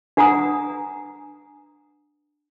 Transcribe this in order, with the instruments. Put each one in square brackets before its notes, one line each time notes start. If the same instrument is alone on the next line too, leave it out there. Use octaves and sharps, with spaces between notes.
[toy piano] D4 B4 F#5 G#5 A#5 D#6